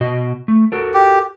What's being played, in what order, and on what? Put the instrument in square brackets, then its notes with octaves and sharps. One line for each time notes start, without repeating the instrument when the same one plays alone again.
[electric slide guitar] B2 F#4 D#5
A3
F#4 A4 A#4
[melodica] G4